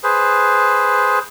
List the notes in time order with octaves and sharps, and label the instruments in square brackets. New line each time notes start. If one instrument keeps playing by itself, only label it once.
[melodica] G#4 B4 C5